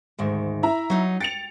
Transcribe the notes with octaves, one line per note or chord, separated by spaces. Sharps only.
D2 G#2 D#3
E4 E5 A#5
F#3 D#4
G5 A6 C#7 F7